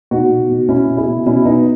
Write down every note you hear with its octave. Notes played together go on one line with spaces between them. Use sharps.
B2 D#4 F#4
B2
B2
B2 C#4 E4
B2
E4 G#4
B2
B2 C#4 E4
B2 B3 D#4